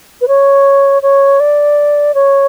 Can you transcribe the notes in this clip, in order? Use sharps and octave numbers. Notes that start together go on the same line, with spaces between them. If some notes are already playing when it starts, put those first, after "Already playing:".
B4
C#5
C#5
D5
C#5